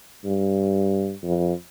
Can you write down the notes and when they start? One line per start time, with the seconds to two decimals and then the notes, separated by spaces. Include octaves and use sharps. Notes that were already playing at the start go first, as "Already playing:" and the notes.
0.24 G2
1.23 F2